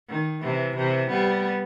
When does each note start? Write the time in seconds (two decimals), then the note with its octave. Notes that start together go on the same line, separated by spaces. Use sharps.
0.09 D#3
0.41 C3 E3
0.76 C3 E3
1.10 G3 B3